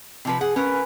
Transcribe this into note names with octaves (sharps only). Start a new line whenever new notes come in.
C3 F3 B4
G#4 F#5
C#4 A#4 B4